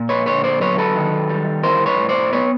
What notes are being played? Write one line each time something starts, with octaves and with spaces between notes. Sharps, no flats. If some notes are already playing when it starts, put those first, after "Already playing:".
Already playing: A#2
B4 C#5
D3 B4 C#5
C5 D5
F#3 B4 C#5
A4 B4
D#3
G3
E3 A#4 C5
B4 C#5
A2
C5 D5
B3 B4 C#5